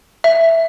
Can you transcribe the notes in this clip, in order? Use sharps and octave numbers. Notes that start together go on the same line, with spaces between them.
E5